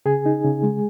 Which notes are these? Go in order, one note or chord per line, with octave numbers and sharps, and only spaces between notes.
C#3 G#4 G#5
D#4
C#3
G#3